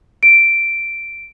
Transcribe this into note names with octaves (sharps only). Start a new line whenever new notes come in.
D7